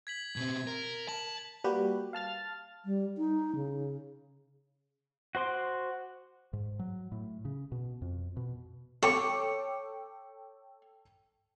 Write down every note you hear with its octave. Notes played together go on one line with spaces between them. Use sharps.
G#6 B6 F#7
B2 C4 G#6
A#4
A5 F#7
G3 A#3 F#4 G4 B4
F5 A5 F6 A6
G3
D#4
C#3
F#4 C5 C6 D6
G#2
F#3
A2
C#3
B2
F2
B2
A4 C#5 G5 C#6 D6